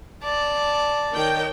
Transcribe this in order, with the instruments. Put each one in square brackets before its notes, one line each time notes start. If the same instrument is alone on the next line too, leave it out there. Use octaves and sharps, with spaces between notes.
[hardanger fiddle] D5 A5
[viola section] D#3 C#5 G5